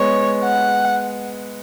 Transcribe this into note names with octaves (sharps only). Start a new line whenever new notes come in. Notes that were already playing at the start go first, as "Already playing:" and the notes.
Already playing: G#3 B3 C#5
F#5